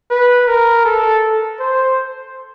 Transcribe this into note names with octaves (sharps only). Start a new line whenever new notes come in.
B4
A#4
A4
C5